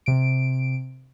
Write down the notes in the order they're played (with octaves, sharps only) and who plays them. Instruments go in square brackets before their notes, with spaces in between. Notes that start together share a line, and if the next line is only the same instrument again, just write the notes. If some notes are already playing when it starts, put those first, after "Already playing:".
[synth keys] C3 D7